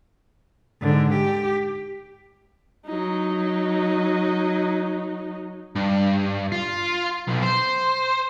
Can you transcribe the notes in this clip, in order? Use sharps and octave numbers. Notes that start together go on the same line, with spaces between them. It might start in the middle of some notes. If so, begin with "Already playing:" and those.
G#2 D3
G4
F#3 D#4
G2
F4
B1
C5